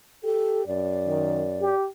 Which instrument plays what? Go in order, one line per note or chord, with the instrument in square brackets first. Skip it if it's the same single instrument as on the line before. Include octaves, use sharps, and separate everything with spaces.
[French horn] G4 [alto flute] A4
[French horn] F#2 [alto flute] D5
[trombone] D#3
G4